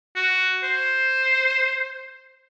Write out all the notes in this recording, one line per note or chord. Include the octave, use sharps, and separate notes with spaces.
F#4
C5